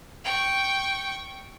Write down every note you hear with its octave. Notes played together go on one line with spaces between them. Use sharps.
G5 C#6